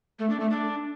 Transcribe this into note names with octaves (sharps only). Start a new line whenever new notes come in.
A3
D4
A3
D4